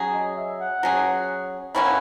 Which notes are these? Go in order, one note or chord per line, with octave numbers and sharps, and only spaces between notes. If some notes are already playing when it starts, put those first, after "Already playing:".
Already playing: F#3 C#4 G#4
D#5
E5
F#5
F#3 C#4 G#4
B2 A#3 C#4 E4 F#5